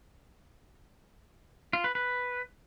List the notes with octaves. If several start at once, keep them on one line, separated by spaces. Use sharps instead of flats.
F4
B4
B4